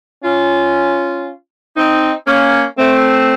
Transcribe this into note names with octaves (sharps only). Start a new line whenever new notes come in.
C#4 F4
C4 D#4
A#3 C#4
A3 C4